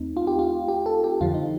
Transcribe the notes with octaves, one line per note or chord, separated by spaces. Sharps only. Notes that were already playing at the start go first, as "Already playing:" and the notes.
Already playing: D#2 A3 C4 D#4
F4
G4
F4
G4
A4
G4
F2 D3 F3 F4
D#4